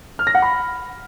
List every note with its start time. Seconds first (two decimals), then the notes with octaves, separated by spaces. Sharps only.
0.19 F6
0.27 A#6
0.35 F#5
0.42 B5